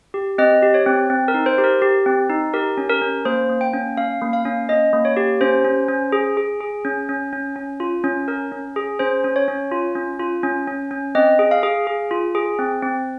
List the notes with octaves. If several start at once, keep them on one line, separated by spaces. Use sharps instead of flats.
G4
C4 D#5
G4
C#5
C4
C4
A#4
D#4
C5
G4
A#4
G4
C4
D#4
G4 A#4
C#4
A#4
C#4
A#3 C5
A#3
G5
C#4
C#4 F5
A#3
F5
C#4
C#4 D#5
A#3
C#5
G4
C#4 C5
C#4
C#4
G#4
G#4
G#4
C#4
C#4
C#4
C#4
F4
C#4
C#4 A#4
C#4
G#4
C#4 C5
C#4
C#5
C#4
F4
C#4
F4
C#4
C#4
C#4
C4 D#5
G#4
F5
G#4
G#4
F4
G#4
C4
C4